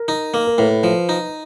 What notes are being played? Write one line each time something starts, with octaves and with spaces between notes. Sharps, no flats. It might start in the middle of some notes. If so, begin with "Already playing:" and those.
Already playing: A#4
D#4
A#3
A#4
A2 B4
F3
D#4